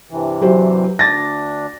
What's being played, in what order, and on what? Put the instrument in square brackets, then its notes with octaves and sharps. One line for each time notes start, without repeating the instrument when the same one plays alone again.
[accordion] G2 C3 E3
[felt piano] F#3 G4 C5
[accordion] D2 D4 [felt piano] A6 A#6